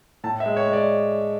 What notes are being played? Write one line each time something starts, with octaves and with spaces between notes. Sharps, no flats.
A2 A5
E5
G#3
C#5
G#3
D5